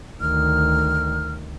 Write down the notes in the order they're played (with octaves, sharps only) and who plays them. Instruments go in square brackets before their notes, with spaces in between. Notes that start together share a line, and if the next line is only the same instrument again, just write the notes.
[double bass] D2 D#3 [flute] F6